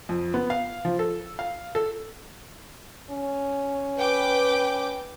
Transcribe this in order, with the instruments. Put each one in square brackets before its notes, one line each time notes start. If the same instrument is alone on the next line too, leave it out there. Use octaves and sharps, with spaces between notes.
[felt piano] F2
B3
F5
F3
A4
F5
A4
[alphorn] C#4
[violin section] B4 G5 D6